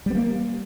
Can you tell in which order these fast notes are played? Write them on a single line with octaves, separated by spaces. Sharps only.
G3 B3 A#3